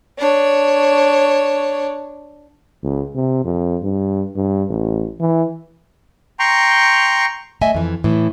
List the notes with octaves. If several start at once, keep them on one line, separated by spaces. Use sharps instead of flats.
D4 C#5
C#2
C3
F2
G2
G2
A1
E3
G5 A#5 C6 C#6
A3 D#5 E5 G#5
F2 E3
A2 E3